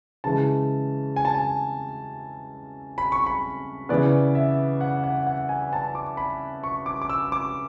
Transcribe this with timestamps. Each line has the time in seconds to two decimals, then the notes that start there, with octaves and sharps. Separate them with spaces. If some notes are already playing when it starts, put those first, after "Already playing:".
0.24 C#3 E3 G#3 A5
1.16 G#5
1.25 A5
1.35 G#5
2.98 B5
3.12 C#6
3.27 B5
3.89 C#3 E3 B3 D5
4.35 E5
4.81 F#5
5.04 F#5
5.27 F#5
5.49 G#5
5.73 A5
5.95 D6
6.17 B5
6.64 C#6
6.86 D6
7.02 D6
7.09 E6
7.32 D6